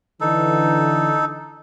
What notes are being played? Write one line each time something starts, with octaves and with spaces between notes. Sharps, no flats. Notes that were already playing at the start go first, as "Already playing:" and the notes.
D3 E3 D#4 A4